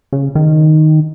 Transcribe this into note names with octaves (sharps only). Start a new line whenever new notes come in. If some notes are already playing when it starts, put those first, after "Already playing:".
C#3
D#3